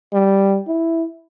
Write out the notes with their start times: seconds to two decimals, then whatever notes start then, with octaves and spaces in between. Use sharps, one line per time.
0.13 G3
0.67 E4